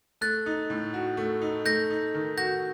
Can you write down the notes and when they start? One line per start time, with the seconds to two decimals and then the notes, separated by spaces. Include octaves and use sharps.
0.21 A3 F#6 A6
0.46 D#4
0.70 A2
0.94 F#4
1.17 A3
1.41 D#4
1.65 A3 G6 A#6
1.90 D#4
2.14 D#3
2.37 F#4 G6 A#6